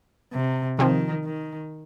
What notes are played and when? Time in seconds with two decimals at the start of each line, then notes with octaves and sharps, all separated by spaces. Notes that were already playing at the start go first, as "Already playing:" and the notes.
0.33 C3
0.79 C3 D#3 F3 C4
1.25 D#3